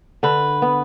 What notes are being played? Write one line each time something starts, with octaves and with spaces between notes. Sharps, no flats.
D3 B4
B3